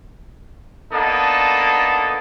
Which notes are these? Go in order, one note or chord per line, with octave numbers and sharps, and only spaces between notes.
A#3 B3 D4 D#4 A4